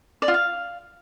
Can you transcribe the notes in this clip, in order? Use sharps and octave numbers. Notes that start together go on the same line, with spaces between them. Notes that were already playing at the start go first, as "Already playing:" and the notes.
D5
F4
F5